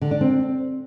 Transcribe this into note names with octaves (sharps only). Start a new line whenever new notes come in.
D3
D4
C4